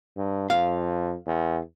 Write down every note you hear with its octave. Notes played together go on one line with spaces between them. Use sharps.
G2
F2 F5
E2